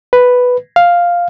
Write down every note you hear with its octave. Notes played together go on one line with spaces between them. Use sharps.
B4
F5